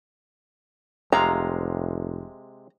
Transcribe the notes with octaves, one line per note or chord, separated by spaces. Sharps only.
F1 C3 G#3 F5 A#5